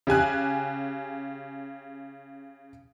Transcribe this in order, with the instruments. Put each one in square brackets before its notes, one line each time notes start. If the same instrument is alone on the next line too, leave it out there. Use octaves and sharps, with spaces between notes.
[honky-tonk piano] C#3 G4 G#5 F#6